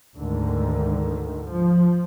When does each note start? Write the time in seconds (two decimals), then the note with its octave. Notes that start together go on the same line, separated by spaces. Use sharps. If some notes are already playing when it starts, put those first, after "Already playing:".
0.15 D2 G#2 D3 D#3
1.44 F3